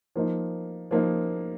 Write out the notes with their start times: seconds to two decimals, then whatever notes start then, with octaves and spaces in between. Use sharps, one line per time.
0.16 F3 A#3 D#4
0.91 F3 A#3 D#4